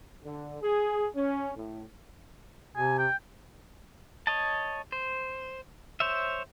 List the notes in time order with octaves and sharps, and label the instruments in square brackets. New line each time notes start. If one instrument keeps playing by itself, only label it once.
[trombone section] D3
G#4
C#4
A2
[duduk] C3 [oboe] G#5
[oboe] G5
[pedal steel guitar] C#5 D#5 A5
C5
C5 C#5 E5